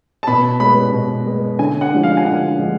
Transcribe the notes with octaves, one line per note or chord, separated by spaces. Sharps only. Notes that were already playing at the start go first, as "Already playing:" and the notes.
A5
B2 B5
G#3 B3 B5
B2
G#3 B3
D3 G#5
F#5
F3 G#3 D4
F5
G#5
D3 F#5
F3 G#3 D4